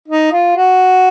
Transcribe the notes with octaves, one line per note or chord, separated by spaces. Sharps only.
D#4
F4
F#4